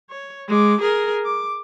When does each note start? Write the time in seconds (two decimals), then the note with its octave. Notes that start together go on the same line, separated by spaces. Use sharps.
0.10 C#5
0.48 G#3 D6
0.81 G#4 A#4
1.25 D6